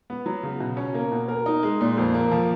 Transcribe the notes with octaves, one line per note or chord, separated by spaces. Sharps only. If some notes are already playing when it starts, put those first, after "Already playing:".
B3
F#3
C#3
B2
C#4
A#3
B2
A#4
D#4
G#3
A#2
F2
A#3
F3